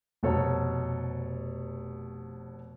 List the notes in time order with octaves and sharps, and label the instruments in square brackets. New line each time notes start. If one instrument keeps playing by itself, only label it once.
[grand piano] F1 B2 A4 C#5 A#5